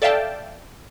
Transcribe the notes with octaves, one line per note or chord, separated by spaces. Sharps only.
A4 D5 E5 F5 G5 A5